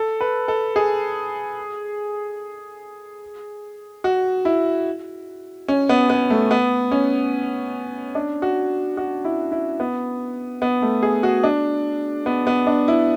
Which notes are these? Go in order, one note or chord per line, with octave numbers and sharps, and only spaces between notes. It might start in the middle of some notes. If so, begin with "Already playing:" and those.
Already playing: A4
B4
A4
G#4
F#4
E4
C#4
B3
B3
A3
B3
C#4
D4
F#4
F#4
E4
E4
B3
B3
A3
G#4
F#4
D4
B3
B3
D4
E4